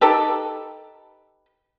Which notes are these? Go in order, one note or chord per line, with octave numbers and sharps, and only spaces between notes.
D#4 G4 A4 B4